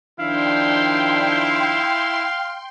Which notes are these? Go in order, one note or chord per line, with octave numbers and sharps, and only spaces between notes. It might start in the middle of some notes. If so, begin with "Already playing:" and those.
D#3 F3 D4 E4 F5 G5 C6